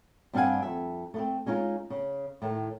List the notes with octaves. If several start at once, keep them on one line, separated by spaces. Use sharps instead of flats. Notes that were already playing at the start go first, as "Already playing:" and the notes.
G2 C4 D4 F5 F#5 G#5
F2 E5
A3 B3 C4
G#3 C#4 D#4 F4
C#3
A2 D#3